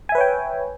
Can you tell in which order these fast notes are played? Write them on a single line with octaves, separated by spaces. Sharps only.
G#5 E5 B4 C#5 G5